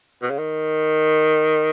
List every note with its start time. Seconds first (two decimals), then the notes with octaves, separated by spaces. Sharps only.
0.22 B2
0.30 C#3
0.38 D#3